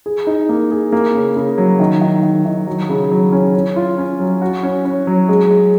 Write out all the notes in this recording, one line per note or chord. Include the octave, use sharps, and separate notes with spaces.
G#4
D#4
A#3
G#4
A#3
C#3
C#3
F#3
D#3
D#3
D#3
D#3
F#3
C#3
F#3
C#4
C#4
F4
C#4
F#3
F#4
C#4
C#4
F#3
G#3
G#3